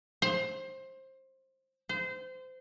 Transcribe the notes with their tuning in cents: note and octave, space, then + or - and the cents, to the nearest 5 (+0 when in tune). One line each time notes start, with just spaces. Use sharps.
C5 +20
C5 -25